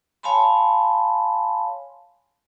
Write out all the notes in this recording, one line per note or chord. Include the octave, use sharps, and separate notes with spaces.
C#5 F5 G#5 A5 B5 C6